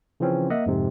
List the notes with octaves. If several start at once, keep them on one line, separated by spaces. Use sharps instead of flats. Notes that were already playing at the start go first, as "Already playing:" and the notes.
C#3 E3 F3 C4 C#4
A#3 D#5 E5 F#5
F2 G#2 C3